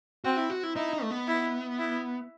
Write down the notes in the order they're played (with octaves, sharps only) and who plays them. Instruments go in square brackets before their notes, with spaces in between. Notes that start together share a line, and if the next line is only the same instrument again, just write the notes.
[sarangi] C4 [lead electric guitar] F#4
[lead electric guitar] E4
F#4
E4
[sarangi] D#4 [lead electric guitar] E4
[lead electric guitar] D#4
A3
B3
[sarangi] E4
E4